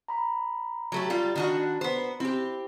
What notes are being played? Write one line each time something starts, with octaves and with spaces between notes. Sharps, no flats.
A#5 B5
F#3 A3 G4
G3 F4
D#3 D4 F#4
B3 C5
C4 E4 G4